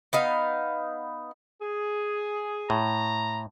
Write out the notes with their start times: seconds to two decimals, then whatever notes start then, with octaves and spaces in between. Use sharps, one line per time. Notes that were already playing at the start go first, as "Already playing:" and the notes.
0.13 B3 D#4 F5
1.62 G#4
2.70 A2 A#5